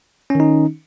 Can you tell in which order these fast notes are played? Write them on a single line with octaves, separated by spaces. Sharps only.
C#4 D#3 D#4